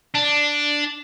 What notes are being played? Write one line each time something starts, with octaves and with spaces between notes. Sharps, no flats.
D4